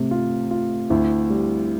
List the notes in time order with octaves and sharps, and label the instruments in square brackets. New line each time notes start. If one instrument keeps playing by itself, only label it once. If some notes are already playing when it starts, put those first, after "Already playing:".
Already playing: [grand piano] C3 [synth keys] A3 C4
[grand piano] F4
F4
[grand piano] D2 [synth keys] C4 E4
[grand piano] G3